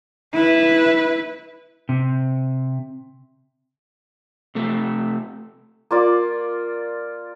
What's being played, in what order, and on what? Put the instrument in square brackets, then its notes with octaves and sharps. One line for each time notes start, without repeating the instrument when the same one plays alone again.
[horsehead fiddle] E4 B4
[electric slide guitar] C3
C3 A3
[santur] A#3 F4 D5